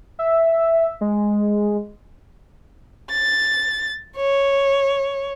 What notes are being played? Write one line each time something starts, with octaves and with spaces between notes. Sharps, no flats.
E5
G#3
A6
C#5